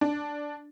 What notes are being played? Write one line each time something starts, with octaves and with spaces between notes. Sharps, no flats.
D4